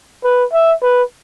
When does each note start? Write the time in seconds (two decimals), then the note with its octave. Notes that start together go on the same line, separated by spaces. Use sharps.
0.24 B4
0.53 E5
0.82 B4